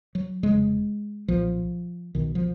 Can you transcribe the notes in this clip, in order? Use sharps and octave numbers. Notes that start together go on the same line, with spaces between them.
F#3
F1 F2 C#3 G#3
B1 A#2 F3
B1 B2 D#3
F3